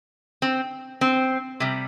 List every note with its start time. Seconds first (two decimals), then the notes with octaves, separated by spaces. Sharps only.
0.42 C4
1.01 C4
1.60 C3 G3